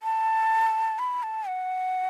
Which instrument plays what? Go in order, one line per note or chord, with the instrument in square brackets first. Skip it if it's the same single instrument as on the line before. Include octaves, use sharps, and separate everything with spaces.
[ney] A5
B5
A5
F#5